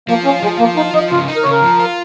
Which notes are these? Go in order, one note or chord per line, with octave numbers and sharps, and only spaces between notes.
F3 A#3
C#4 F4
F3 G#3
F3 A#3
D#4 F4
F3 D#4
C#3 F4
D#4
A#4
C#3 C#5
A#4
F3
F4